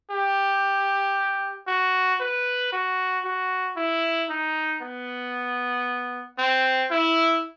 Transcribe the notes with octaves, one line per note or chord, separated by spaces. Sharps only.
G4
F#4
B4
F#4
F#4
E4
D#4
B3
C4
E4